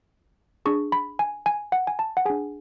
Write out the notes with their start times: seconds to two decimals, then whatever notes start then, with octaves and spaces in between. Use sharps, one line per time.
0.66 D4 G#4 C#6
0.92 B5
1.19 G#5
1.46 G#5
1.72 F#5
1.87 G#5
1.99 A5
2.17 F#5
2.25 D4 G#4 G#5